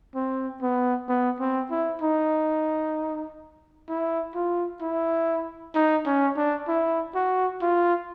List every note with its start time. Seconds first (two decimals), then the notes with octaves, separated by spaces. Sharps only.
0.15 C4
0.62 B3
1.09 B3
1.40 C4
1.71 E4
2.02 D#4
3.89 E4
4.35 F4
4.81 E4
5.75 D#4
6.06 C#4
6.37 D4
6.68 E4
7.15 F#4
7.61 F4